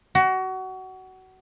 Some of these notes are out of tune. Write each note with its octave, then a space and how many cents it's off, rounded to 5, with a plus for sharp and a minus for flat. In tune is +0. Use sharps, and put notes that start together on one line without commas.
F#4 +25